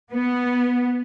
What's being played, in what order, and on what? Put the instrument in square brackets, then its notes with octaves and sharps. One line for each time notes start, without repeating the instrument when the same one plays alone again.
[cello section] B3